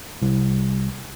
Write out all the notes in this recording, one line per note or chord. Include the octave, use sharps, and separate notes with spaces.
C2